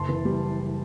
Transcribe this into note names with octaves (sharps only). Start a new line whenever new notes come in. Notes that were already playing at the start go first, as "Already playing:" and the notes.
Already playing: F#1 A5 C6
E3
G3